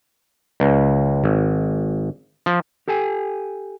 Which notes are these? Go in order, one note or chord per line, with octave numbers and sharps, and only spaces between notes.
C#2
G#1
F3
G4 A4 G5 G#5